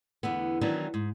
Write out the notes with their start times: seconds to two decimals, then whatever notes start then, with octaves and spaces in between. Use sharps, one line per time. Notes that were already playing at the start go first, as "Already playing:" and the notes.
0.23 E2 D3 B3
0.61 D#3 E3 F#3 B3 D4
0.94 G#2